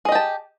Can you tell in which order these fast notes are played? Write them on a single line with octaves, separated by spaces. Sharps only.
G#4 D#5 G4 A5